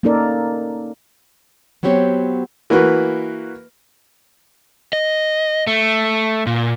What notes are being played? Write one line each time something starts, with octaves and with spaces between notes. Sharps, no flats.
A#3 C#4 D#4 A4 A#4 D5
F#3 B3 C4 G4 C#5
E3 A#3 F#4 B4
D#5
A3
A#2